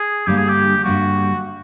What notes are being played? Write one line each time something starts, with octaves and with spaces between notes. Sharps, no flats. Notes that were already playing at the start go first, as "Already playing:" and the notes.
Already playing: G#4
G2 D3 G3 A#3 G4
G#4
G4
G2 D3 G3 A#3 F#4